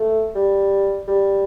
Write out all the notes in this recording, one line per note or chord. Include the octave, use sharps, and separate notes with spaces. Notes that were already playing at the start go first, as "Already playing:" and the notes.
Already playing: A3
G3
G3